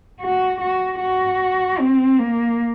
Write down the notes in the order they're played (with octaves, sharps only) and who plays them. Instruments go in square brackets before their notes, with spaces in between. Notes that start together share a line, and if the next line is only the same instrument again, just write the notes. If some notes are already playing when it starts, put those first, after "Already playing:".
[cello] F#4
F#4
F#4
C4
A#3